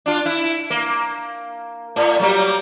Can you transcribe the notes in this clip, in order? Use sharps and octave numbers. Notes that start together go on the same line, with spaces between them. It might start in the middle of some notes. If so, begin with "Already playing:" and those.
D4 F4
E4
A#3
A2
F#3 G3 A#3